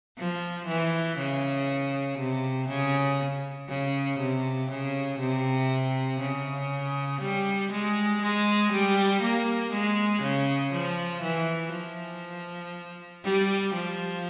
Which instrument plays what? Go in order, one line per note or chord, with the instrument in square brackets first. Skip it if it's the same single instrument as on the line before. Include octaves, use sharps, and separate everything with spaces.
[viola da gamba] F3
E3
C#3
C3
C#3
C#3
C3
C#3
C3
C#3
G3
G#3
G#3
G3
A#3
G#3
C#3
F3
E3
F3
G3
F3